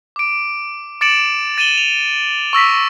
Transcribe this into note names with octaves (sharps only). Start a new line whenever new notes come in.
D6 D7
D6 A6 C#7 D7 E7 F#7
A6 D#7 E7 F#7 G7
F7
C#6 E6 A#6 B6